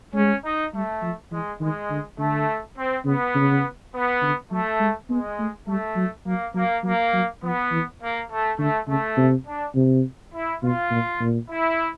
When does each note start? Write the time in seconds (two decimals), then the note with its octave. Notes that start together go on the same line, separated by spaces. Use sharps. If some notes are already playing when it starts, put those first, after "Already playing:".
0.14 G#3 C#4
0.44 D#4
0.73 G3 A3
1.02 F3
1.31 E3 G#3
1.60 D#3 G#3
1.90 D3
2.18 D3 A3
2.76 C4
3.05 C#3 B3
3.35 C#3
3.93 B3
4.22 D3
4.51 F#3 A3
4.80 G#3
5.10 G#3 B3
5.39 A3
5.67 G3 A3
5.96 F#3
6.26 F#3 A#3
6.54 F#3 A#3
6.83 F#3 A#3
7.13 F#3
7.42 F3 B3
7.71 E3
8.01 A#3
8.30 A3
8.58 D3 A3
8.87 C#3 A3
9.17 C3
9.46 D4
9.75 C3
10.33 E4
10.63 B2 F4
10.91 A#2
11.20 A#2
11.49 E4